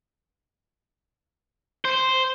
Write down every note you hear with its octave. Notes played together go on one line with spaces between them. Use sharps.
C5